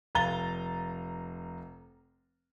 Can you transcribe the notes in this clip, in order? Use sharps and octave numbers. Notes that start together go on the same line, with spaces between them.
F1 F5 A#5 A6 G7